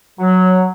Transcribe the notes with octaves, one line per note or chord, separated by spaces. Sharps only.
F#3